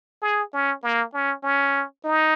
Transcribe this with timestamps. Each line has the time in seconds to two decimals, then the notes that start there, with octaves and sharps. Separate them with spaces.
0.22 G#4
0.53 C#4
0.83 A#3
1.13 C#4
1.43 C#4
2.04 D#4